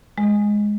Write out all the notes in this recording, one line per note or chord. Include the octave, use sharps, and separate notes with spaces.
G#3